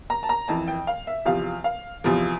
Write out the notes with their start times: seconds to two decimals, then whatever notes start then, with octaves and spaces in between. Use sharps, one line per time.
0.10 A#5
0.23 A5
0.29 A#5
0.48 F2 E3 A5
0.68 G5
0.87 F5
1.07 E5
1.25 E2 C3 F3 F5
1.64 F5
2.04 E2 C3 F3